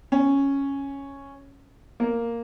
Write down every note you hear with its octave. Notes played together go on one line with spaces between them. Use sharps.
C#4
A#3